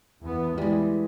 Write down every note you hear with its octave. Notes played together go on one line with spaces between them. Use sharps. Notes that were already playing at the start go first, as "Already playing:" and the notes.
E2 B3
E3 G3 G#3